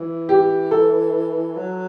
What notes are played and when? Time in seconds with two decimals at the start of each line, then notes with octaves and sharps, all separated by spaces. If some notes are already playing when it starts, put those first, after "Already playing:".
Already playing: E3
0.29 G4
0.71 A4
1.57 F#3